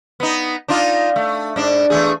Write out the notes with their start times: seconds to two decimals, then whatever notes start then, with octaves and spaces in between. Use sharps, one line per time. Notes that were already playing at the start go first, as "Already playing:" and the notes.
0.20 B3 D#4
0.68 D4 D#4 F4
1.16 A3
1.56 G#2 D4
1.90 E2 A3 G#4